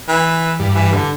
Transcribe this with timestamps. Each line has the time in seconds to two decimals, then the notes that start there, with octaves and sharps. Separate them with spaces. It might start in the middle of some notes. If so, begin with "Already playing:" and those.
0.09 E3
0.60 G2
0.76 E3
0.94 D3